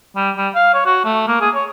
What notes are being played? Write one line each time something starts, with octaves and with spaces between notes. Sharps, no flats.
G3
G3
F5
C#5
F#4
A3
A#3
G#4
C#5